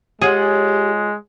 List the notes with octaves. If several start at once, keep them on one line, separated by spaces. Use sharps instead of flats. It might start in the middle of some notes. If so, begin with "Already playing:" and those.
G#3 F4 G4 G#4 C#5 F#5